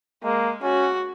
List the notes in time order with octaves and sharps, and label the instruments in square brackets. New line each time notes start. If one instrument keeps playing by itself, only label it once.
[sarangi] G#3 [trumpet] A#3
[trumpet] C#4 [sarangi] F#4